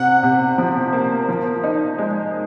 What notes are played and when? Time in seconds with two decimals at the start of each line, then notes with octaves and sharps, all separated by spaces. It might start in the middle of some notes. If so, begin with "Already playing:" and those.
Already playing: C3 F#5
0.23 C3
0.58 F3
0.93 A#3
1.29 F3
1.64 D#4
1.98 G#3